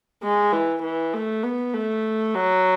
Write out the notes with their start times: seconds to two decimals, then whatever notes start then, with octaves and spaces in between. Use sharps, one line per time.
0.23 G#3
0.52 E3
0.83 E3
1.14 A3
1.43 B3
1.74 A3
2.34 F#3